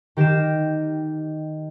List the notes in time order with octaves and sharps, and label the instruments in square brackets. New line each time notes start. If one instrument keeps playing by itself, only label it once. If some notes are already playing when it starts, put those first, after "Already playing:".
[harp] D#3 G4 A#6 C7 E7